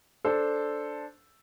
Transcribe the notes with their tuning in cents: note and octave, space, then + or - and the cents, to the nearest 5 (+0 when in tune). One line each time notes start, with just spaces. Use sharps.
D4 +0 A4 +0 C5 +0